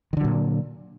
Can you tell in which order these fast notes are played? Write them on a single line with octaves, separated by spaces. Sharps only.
D#3 D3 F#3 A#2